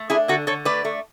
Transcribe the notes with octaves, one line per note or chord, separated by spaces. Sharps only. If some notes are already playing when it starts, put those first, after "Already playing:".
Already playing: A3
D4 E4 G#4
D3 F#4 A4
D3 A4 C#5
A3 B4 D5
A3